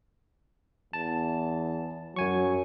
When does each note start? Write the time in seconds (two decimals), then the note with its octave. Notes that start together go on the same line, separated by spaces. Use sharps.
0.93 E2 A5
2.16 F#2 F#3 G#5 C#6